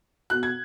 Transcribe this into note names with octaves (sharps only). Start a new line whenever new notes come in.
B2 F#6
G#6